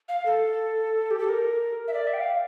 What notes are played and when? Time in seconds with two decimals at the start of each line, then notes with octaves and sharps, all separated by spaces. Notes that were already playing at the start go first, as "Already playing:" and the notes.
0.08 F5
0.26 A4
1.11 G4
1.19 A4
1.29 A#4
1.88 E5
1.94 D5
2.07 E5
2.13 G5
2.20 F5